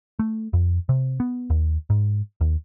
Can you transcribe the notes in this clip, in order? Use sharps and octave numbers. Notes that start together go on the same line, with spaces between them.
A3
F2
C3
B3
D#2
G#2
D#2